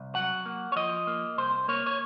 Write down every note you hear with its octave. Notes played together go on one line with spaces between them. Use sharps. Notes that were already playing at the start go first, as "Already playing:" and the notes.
Already playing: C2
F#3 F#5
A#3
C#5
F3 D#5
A#3
C2 C5
A#3 C#5
C#5